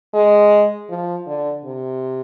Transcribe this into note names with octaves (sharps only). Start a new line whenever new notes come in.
G#3
F3
D3
C3